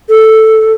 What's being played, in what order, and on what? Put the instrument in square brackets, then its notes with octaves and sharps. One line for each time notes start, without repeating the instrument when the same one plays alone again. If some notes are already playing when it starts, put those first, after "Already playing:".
[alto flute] A4